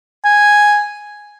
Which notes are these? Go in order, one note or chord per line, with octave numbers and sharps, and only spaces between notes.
G#5